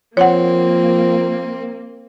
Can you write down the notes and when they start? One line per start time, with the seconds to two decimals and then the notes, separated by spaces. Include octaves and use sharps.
0.17 F3 A#3 C4 C#5 F#5